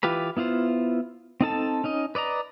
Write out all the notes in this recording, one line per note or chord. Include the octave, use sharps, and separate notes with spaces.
E3 F4 G4 B4 B5
B3 E4 F4 C5
C4 D#4 A4 A5
C#4 D#4 D#5
B4 D5 D#5 A#5